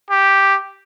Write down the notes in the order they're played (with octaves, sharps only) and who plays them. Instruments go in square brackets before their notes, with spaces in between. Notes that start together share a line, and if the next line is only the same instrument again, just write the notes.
[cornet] G4